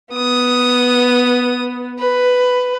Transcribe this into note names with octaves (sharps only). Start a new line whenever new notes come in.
B3 D#6
B4